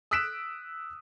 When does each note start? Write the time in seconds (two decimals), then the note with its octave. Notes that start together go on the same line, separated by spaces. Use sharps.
0.11 D#6 E6 F#6 B6 D7 E7